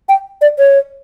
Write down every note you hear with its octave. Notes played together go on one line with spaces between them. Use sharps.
G5
D5
C#5